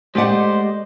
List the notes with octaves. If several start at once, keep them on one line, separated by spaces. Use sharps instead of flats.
G#3 A3 G4 C5 D5 D#5 F#5